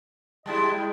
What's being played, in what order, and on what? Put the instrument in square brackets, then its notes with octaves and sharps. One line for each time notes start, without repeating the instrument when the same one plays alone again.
[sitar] G3 G#3 E4 [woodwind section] D#5 G5 A5
[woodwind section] G#3 G5